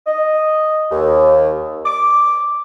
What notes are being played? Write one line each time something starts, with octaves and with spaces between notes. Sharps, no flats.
D#5
D#2
D6